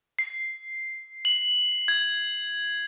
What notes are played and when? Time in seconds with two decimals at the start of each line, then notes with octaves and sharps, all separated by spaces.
0.19 C7
1.25 F#7
1.88 G#6